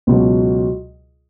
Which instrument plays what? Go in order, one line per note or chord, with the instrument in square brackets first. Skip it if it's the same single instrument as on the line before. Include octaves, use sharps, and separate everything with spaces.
[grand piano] C#2 B2 F#3